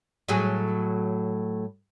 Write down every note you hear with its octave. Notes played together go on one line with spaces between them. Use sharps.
A2 F#3 G#4